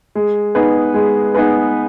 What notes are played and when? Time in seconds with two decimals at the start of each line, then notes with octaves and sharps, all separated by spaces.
0.15 G#3
0.55 B3 D#4 G#4 B4
0.94 G#3
1.35 B3 D#4 G#4 B4